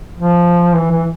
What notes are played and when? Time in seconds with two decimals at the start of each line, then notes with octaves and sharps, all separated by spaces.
0.18 F3
0.74 E3
0.92 E3